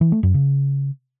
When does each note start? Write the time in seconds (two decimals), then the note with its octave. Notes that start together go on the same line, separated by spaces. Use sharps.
0.01 E3
0.12 A3
0.23 F#2
0.34 C#3